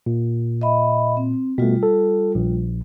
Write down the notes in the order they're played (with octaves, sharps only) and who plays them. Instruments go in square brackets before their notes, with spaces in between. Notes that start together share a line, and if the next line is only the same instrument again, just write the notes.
[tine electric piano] A#2
[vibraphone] D#5 E5 B5
C4
[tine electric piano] B2 A3 [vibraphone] G3 F4
[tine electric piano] A4
A#1